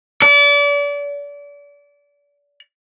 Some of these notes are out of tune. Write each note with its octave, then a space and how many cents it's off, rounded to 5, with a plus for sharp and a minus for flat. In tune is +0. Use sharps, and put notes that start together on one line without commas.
D5 -35